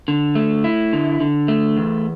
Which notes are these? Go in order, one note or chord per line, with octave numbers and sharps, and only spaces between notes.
D3
A3
E4
D3
D3
A3
E2